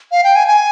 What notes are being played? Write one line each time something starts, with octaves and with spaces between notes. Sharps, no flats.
F5
G5
G#5
G#5